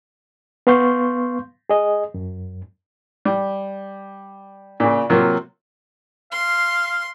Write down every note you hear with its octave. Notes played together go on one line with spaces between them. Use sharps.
B3 F5 C6 C#6 G6
G#4 D#5
F#2
G3
A#2 C#3
C3 F#3 A#3 F4
F5 C6